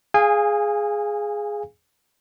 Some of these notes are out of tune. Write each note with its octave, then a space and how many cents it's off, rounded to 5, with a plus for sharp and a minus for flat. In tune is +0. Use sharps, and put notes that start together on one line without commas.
G#4 +0 F5 +0 G#5 -25